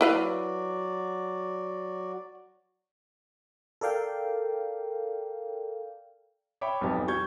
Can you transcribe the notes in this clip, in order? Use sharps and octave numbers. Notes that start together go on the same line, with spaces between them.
F#3 E4 F#4 B4 D5 F5
A4 A#4 D5 F5 G5
C#5 E5 G5 B5 C#6 D6
B1 F2 B3 G4
G3 C#6 G6 G#6